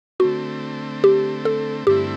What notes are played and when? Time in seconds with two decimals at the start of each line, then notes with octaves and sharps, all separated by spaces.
0.20 D3 A3 C4 F#4
1.04 G4
1.45 A4
1.87 G2 D3 A3 C4 E4 G4